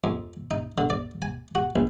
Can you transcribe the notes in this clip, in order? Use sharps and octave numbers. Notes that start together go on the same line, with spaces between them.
F2
D#4
D3
D5
G#5
F#4
A#1